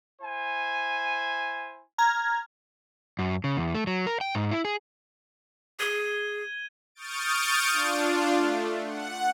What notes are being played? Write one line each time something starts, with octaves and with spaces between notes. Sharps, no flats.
E4 C5 G#5
A#5 F6 G#6
F#2
C#3
E2
A3
F#3
A#4
G5
G#2
E4
G#4
G#4 G#6 D#7 G7
C#6 D#6 F6 G6 A6 D7
D4 F4
A3
F#5